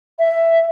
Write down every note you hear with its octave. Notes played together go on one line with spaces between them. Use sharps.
E5